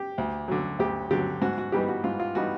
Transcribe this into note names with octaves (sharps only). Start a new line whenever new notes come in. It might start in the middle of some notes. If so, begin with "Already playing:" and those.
Already playing: G4
D2
D3 F#3
D2 G4
D3 F#3 G4
G#2 F#4
F#4
E3 G3 B3 D#4 G4
F#4
G#2 F4
F4
E3 G3 B3 D#4 F#4